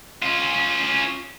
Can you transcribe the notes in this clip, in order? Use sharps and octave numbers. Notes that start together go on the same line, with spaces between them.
C#4 F4